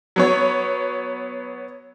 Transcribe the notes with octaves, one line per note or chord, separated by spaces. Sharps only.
F#3 B3 C#5